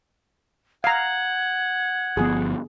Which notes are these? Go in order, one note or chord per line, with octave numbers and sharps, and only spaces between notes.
F5 F#5 A#5 G#6
G1 F3 B3 G#4